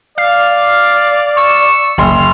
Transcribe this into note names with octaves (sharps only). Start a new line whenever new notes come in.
D5 F5
C#6 E6
F#1 C6 F6